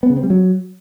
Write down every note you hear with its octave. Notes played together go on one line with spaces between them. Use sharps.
B3
C#3
C4
G3
F#3